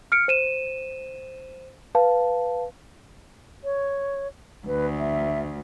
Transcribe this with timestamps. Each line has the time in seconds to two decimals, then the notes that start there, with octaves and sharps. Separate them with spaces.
0.12 F6 C#7 D7
0.28 C5 D#7 E7
1.95 B4 F5 A5
3.64 C#5
4.67 D2 B4
4.99 E5